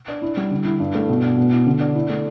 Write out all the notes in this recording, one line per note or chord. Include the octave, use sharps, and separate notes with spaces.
D4
E4
G3
D3
E4
G2
A3
B2
D4
B2
E4
D3
D4
E4
A3